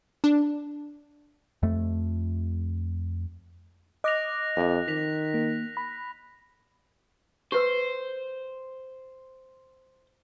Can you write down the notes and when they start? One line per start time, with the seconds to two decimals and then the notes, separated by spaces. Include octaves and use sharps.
0.24 D4
1.63 F2 A3
4.04 D#5 D6 F#6 A#6 F7
4.56 F2
4.88 D#3 B6 F7
5.34 A#3
5.77 B5
7.52 G4 B4 C5 E6